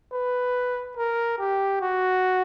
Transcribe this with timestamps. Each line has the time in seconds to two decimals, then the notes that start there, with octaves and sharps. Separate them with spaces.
0.12 B4
0.97 A#4
1.39 G4
1.81 F#4